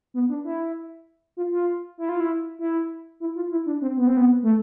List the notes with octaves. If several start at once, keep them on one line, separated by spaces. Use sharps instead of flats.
B3
D4
E4
F4
F4
E4
F4
E4
E4
E4
F4
E4
D4
C4
B3
C4
B3
A3